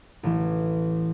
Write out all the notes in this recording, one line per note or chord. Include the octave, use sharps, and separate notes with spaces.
A1 E3